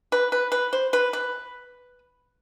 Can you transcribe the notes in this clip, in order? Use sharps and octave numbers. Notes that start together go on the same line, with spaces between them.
B4
B4
B4
C5
B4
B4